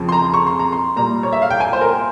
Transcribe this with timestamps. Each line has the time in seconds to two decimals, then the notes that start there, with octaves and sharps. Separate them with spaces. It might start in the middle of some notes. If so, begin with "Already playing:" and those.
Already playing: F2 C#3 F3
0.09 C6
0.12 A#5
0.34 C#6
0.47 C6
0.59 A#5
0.72 C6
0.96 A#2 G3 A#5
1.23 C#5
1.33 E5
1.42 F5
1.50 G5
1.60 G#5
1.73 C5
1.81 A#4